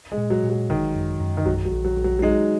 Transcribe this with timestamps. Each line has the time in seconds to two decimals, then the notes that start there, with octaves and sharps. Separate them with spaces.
0.12 G#3
0.18 A#2
0.30 F#3
0.43 A#2
0.50 F#3
0.69 G#1 D#3
0.95 F#2
1.20 F#2
1.37 D#3
1.46 A#1 F#3
1.65 F#3
1.72 A#1
1.85 F#3
1.98 A#1
2.04 F#3
2.19 F#3
2.22 G#3 D#4